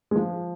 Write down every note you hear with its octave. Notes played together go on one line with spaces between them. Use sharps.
G#3
F3